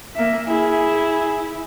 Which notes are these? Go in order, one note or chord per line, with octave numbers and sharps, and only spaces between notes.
A#3 E5
E4 G#4